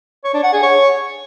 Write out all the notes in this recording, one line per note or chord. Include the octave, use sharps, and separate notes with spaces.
C#5
D4
F#5
G#4
C#5